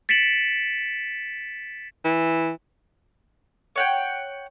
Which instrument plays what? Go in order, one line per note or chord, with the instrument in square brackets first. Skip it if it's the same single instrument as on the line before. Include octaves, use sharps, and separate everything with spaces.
[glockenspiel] A6 B6 C#7 D7 E7 F#7
[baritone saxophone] E3
[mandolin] C#5 F#5 G5